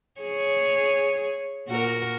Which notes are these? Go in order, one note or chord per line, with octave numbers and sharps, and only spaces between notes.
G#4 C#5
A#2 F#4 A#4